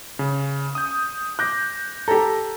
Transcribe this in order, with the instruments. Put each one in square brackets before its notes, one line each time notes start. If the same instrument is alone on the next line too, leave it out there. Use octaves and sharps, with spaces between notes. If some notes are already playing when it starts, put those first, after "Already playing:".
[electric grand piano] C#3
D#6 G6
[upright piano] D6 [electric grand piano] F#6 G6 A#6
[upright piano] G4 A4 [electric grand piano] A#5